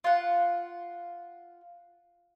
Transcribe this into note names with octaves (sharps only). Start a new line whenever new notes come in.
F4 F#5